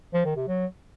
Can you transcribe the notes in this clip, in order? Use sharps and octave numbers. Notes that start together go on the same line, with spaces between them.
F3
D#3
C3
F#3